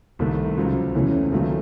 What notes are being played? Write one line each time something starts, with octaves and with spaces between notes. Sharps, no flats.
C2 C3 D#3 A3
C#2 C3 F#3 C4
E2 C3 E3 A3 C#4
C#2 C3 D#3 F#3 A3